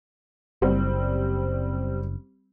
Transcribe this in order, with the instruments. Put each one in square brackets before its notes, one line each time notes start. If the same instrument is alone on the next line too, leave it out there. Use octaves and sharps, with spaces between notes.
[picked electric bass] F#1 [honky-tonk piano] G3 C4